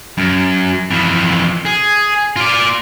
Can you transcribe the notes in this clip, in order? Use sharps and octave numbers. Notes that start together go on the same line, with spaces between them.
F#2
F2 E3
G#4
F4 D5